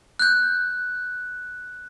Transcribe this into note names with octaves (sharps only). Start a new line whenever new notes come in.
F#6 G6